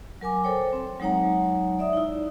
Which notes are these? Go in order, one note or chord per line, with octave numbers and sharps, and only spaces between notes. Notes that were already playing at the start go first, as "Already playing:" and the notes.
F#3 A#4 G#5 D6
A4 C5 C#5 G5
C4
F#3 G#3 D#4 C#5 F#5 A#5
D5 E5 D#6
D#4 E4